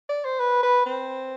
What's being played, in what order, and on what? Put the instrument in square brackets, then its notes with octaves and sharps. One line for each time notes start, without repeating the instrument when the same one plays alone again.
[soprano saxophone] D5
C5
B4
B4
C4